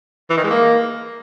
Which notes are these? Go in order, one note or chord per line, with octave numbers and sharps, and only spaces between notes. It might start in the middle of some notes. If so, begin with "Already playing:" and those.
E3
D#3
G#3
A#3